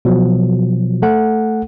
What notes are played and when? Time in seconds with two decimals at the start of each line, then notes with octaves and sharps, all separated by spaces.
0.05 B2 F3 F#3
1.02 A3 A4 F#5